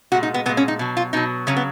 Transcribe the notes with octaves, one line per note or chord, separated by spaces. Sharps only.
A#2 G#3 F#4
D#4
B3
A#2 G#3 B3
C#4
D#4
B2 F#3
F4
B2 F#3 D#4
C#3 F#3 C#4
B3